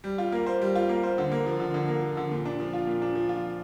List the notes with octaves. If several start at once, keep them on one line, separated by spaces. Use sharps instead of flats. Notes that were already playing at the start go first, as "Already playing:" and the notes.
G3
F4
A#3
C5
G3
F4
A#3
C5
D3
A#3
F3
D3
D3
A#3
F3
D3
A#2
D4
F3
F4
A#2
D4
F3
F4